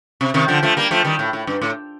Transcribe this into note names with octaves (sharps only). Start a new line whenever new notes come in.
C3
C3 D#3
D3 F3
F3 A3
G3 A#3
F3 A3
D#3 G3
A2
A2
G2
A2